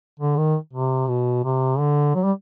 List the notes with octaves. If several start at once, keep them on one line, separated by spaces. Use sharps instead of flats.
D3
D#3
C3
B2
C3
D3
F#3
G3